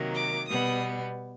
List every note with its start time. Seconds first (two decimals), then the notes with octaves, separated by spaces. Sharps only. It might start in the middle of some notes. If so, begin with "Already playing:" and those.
Already playing: C3 D#3 F#3 A#3
0.15 D6
0.48 B2 G3 B3 D#6